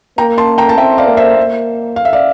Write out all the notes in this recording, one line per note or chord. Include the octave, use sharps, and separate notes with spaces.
A#3 G5 A#5
A5 C6
G5 A#5
A5
C4 E5 G5
D5 F5
A#3
C5 E5
A#3
F5
E5
D5 F5